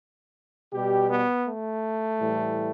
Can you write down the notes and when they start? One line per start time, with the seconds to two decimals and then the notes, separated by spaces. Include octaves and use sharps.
0.73 B2 G3 G4
1.10 B3
1.47 A3
2.20 A2 E3 G3